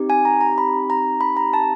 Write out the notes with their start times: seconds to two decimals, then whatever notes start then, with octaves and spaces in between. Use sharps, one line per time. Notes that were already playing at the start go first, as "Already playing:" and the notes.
Already playing: C4 D#4 G4
0.10 G#5
0.25 A#5
0.41 A#5
0.58 B5
0.90 A#5
1.21 B5
1.37 A#5
1.53 A5